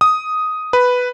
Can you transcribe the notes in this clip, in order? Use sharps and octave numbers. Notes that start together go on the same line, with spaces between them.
D#6
B4